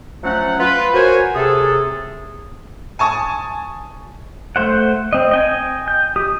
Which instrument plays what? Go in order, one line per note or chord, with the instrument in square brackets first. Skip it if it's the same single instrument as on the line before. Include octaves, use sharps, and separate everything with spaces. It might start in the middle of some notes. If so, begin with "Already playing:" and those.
[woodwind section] F3 F#3 A3 C#4 F#5
F4 B4
F#4 A#4 C5 C#5 G#5
C3 G#4 A4
[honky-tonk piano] G#5 A5 C#6 D#6
[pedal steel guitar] A3 C5 F#5
C4 D#5
D#5 G5 G#5
G6
G4 D#6